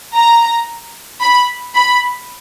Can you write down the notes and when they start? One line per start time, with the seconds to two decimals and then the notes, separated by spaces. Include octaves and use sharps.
0.15 A#5
1.22 B5
1.75 B5